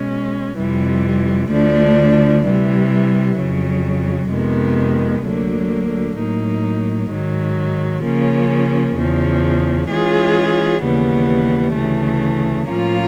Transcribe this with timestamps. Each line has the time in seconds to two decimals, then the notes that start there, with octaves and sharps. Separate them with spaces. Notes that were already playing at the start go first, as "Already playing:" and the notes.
Already playing: B2 G#3 C#4
0.57 F2 C3 E3 G3
1.51 D2 D3 F3 A3 D4
2.44 C3 E3 G3
3.37 F2 C#3 F#3
4.30 F2 C3 D#3 G#3 B3
5.23 D2 D3 F#3 A#3
6.16 A2 F#3 A#3 D#4
7.10 G#2 D#3 F#3
8.02 C#3 F3 A#3 C#4
8.96 E2 C#3 F3
9.89 E3 G#3 C#4 F4 G#4
10.83 D#2 C#3 E3 G3 B3
11.75 D2 C#3 E3 A3
12.68 A2 F3 A#3 C#4 F4